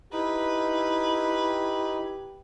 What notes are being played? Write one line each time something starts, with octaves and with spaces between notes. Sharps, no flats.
D#4 E4 G4 B4